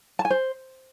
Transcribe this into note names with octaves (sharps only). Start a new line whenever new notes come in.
A5
G#5
C5